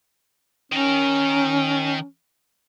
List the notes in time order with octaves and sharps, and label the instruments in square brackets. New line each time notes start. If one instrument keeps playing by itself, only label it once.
[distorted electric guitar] D#3 A#4 [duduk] C#4